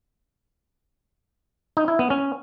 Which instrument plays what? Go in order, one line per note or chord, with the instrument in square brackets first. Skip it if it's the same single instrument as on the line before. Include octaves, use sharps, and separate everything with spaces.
[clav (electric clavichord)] D#4
E4
B3
C#4